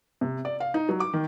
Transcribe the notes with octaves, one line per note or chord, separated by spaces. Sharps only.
C3
D5
F5
D#4
F#3
D6
D#3